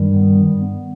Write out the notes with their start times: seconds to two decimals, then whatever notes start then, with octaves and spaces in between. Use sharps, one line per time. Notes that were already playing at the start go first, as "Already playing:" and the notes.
Already playing: G2 D#3 G3
0.15 B3